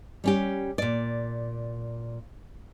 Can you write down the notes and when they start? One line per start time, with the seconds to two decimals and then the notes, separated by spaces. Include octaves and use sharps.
0.24 G3 C#4 G4
0.78 A#2 D5